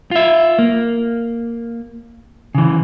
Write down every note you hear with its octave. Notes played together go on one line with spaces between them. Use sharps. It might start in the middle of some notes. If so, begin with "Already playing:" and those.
F4 E5
A#3
C#3 E3